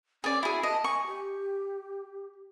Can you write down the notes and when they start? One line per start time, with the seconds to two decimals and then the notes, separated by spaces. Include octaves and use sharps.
0.24 C#4 G#4 D5
0.43 E4 F#4 G#4
0.63 D#5 A5
0.84 G#5 C#6
1.07 G4